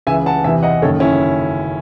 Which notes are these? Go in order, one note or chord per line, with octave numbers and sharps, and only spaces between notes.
C#2 C#3 E3 E5 G#5
F#5 A5
E2 C3 E3 E5 G#5
D#5 F#5
F#1 F#2 D#3 A4 C#5
C#4 E4